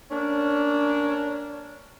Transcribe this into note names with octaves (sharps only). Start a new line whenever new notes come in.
A#3 C#4 D4